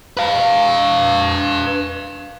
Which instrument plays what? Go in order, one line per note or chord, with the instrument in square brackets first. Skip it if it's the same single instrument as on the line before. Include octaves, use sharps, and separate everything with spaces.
[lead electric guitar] B4 F5